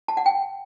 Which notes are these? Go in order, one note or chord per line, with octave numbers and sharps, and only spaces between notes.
A5
F#5
G5